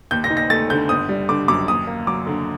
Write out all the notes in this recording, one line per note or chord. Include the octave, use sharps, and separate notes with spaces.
D#2 G6
A#6
D#4
A#6
A3 A6
D3 G6
G1 D#6
G3
D3 D6
F#2 D6
D#2 D#6
A#3
F#3 D6
D3